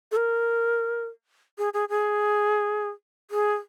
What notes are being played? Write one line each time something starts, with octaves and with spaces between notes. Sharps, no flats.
A4
A#4
G#4
G#4
G#4
G#4